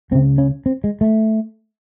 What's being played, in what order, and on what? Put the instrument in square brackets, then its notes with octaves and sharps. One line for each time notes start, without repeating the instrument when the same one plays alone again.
[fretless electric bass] C#2 C4
C#3
C#4
C4
G#3
A3